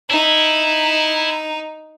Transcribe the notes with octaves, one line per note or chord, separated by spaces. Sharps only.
D#4 E4